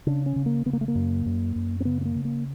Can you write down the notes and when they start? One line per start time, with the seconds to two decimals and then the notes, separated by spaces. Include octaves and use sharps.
0.07 C#3 D4
0.26 C#4
0.36 C#3
0.46 A#3
0.66 C#3 B3
0.73 A#3
0.81 A3
0.88 A#3
0.95 F#2
1.26 F#2
1.56 F#2
1.80 C4
1.85 C#3 B3
2.01 B3
2.05 A#3
2.15 C#3
2.25 A#3